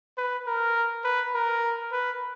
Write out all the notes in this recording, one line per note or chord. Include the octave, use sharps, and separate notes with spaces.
B4
A#4
B4
A#4
B4